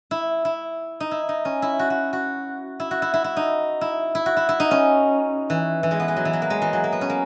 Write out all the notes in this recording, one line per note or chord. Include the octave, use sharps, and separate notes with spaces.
E4
E4
D#4
E4
D#4
C#4
E4
F#4
F#4
F#4
E4
F#4
E4
E4
E4
D#4
E4
E4
F#4
E4
E4
D#4
C#4
E3
E3
G#3
B3
G#3
F#3
E3
F#3
A#3
G#3
E3
F#3
A#3
B3
C#4
A#3